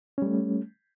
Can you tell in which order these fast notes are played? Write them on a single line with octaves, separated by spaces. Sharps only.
C#4 G3 A3